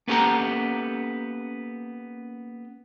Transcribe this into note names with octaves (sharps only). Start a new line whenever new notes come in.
A#3 B3 C#4 G4 A4 A#5